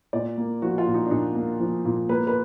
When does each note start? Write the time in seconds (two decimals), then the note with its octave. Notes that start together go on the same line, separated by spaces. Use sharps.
0.13 A#2 D5
0.38 A#3
0.62 F3 F#4
0.78 F4
0.87 A#2
0.94 D#4
1.06 D4
1.11 A#2 D#4
1.35 A#3
1.60 F3
1.85 A#2
2.09 A#3 B4
2.27 B4